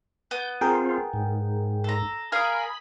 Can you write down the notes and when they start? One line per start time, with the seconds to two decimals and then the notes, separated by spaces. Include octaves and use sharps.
0.31 B3 G6
0.61 C4 F4 G#4 A#4 G5
1.13 G#2
1.84 A4 A#5
2.32 G#4 A#4 F5 B5 D#6 G#6